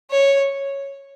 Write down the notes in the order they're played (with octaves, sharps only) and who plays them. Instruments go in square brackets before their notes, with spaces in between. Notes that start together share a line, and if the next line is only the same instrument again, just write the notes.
[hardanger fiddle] C#5